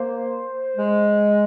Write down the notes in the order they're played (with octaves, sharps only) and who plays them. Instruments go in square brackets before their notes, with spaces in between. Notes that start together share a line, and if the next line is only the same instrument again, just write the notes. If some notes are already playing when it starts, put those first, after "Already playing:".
Already playing: [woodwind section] A#3 [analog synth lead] C5
[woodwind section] G#3